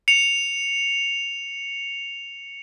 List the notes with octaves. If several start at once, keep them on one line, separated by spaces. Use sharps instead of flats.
C#7 F7